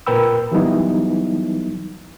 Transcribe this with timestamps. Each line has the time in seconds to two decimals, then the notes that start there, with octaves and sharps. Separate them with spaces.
0.07 A#2 A#4 B4 G5 B5 E6
0.52 E3 F#3 G3 B3 D#4 E4